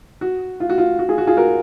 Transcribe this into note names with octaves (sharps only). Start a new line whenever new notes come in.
F#4
F4
F#4
F4
F#4
F4 G#4
F#4
F4 G#4
F#4 A#4